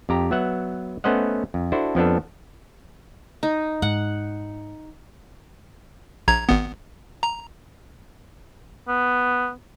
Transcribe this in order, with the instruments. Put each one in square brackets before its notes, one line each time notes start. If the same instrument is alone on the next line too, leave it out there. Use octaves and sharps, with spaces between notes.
[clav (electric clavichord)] F2 G4 A#5
F#3 B3 E5 F#5
A3 B3 C#4 C5 D#5 F#5
F2
D4 E4 F#4 A4 C5
F2 F3 B3 D4 A4
[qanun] D#4
[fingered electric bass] G#2 [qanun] F#5
[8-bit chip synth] A#1 A#5 G#6
G#1 B3
A#5
[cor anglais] B3